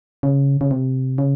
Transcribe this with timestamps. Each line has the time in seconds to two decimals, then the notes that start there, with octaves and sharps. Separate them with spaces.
0.23 C#3
0.61 C#3
0.71 C3
1.18 C#3